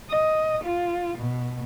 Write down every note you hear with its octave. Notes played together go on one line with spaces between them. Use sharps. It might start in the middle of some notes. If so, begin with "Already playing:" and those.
D#5
F4
B2